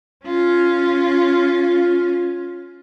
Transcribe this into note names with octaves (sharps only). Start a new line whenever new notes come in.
C#4 F4